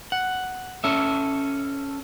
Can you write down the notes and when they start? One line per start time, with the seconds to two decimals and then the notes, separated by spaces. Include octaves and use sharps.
0.12 F#5
0.84 C#4 A4 E5